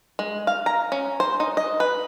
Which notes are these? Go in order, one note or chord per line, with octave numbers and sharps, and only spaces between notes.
G#3
F5
A#5
C#4
C5
D#4
D#5
B4